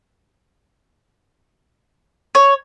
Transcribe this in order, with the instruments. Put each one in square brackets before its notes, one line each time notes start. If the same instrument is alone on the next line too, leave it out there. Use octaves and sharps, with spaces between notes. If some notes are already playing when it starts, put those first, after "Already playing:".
[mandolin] C#5